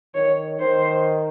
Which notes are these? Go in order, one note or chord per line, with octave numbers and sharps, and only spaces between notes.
D#3 C#5
D#3 C5